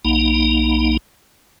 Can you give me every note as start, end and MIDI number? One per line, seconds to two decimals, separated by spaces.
0.05 0.97 35
0.05 0.97 58
0.05 0.97 63